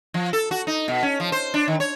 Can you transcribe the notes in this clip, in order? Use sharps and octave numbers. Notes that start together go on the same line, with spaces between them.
F3
A4
F#4
D#4
B2
C#4
F3
C5
D4
D#3
C#5